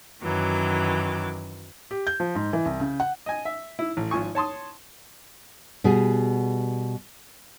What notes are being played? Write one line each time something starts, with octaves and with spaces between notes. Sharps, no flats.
F#2 D#3 E3 F#3 D6
G4
G6
F3
G#2
E3
C2
C#3
F#5
D#5 G#5
E5
E4
A1
G#1 F3 G#5 C#6
C#5 A5 C6 D#6
B2 G3 B3 G#4